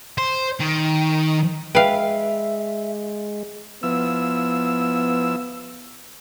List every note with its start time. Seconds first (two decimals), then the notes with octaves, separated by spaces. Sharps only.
0.18 C5
0.60 D#3
1.75 G#3 B4 E5 F5 G5
3.83 F3 B3 E4 E6